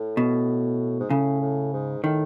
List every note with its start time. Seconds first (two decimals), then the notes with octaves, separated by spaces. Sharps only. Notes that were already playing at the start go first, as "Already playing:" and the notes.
Already playing: A2
0.17 B2
1.00 G#2
1.10 A2 C#3
1.41 A2
1.73 G#2
2.03 A2 D#3